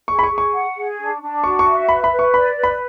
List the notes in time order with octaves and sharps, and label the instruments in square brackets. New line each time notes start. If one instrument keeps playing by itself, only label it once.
[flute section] G#4 [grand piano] C#6
[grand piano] B5
C#6
[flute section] G#4
[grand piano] C#6
[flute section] F#5
G#4
D4
D4
[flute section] F#4 [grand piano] C#6
[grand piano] C#6
[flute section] E5
[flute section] B4 [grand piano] B5
[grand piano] B5
[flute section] B4
[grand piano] C#6
[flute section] D5 [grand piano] B5
[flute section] B4
[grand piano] B5